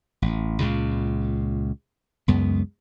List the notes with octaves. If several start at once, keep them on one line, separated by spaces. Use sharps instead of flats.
A1
C#2 A#2 C#3
C#2 F#2 G#3 B3